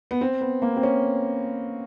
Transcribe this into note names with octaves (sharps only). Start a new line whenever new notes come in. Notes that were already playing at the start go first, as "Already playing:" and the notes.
B3
C4
B3
A#3
C4
C#4